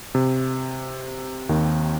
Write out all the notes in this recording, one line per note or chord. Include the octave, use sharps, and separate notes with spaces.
C3
D#2 D#3